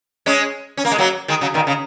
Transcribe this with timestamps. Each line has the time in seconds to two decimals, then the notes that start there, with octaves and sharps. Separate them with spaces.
0.26 G#3 C#4
0.77 C#4
0.85 A#3
0.92 G#3
0.98 F#3 A#3
1.28 D#3 G#3
1.41 C#3 F#3
1.54 A#2 D#3
1.67 C#3